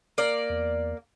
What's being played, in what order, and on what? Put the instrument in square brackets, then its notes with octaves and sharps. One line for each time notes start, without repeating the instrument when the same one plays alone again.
[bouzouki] A#3 D5
[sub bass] E2